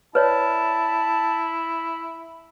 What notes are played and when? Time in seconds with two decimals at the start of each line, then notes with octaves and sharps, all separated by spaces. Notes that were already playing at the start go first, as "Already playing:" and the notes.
0.15 E4 B4 C#5 D5 A5